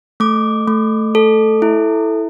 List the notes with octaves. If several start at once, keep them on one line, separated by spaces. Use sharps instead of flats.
A3 D6
A3
A4
E4